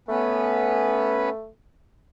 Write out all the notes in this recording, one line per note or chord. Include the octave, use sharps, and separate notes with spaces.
A3 B3 C#4 B4